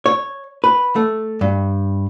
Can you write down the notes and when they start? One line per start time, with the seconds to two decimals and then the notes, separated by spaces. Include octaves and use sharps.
0.06 C#5
0.64 B4
0.96 A3
1.41 G2